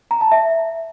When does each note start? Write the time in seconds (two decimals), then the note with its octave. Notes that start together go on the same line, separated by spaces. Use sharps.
0.11 A#5
0.21 A5
0.32 E5